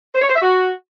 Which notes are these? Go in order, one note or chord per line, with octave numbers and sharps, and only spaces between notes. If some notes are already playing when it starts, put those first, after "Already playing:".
C5
C#5
C5
E5
F#4